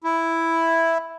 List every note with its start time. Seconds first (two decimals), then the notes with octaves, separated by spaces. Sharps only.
0.04 E4